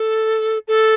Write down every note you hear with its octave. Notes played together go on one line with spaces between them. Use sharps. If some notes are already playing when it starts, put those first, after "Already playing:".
Already playing: A4
A4